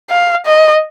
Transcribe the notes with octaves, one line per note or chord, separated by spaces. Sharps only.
F5
D#5